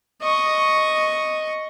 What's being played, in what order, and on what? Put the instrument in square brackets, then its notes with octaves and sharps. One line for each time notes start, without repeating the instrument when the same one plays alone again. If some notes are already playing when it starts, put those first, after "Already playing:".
[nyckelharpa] D#5 C#6